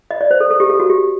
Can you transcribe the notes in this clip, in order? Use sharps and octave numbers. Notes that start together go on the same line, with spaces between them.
D#5
D5
C5
A4
A4
G4
A4
F#4
G4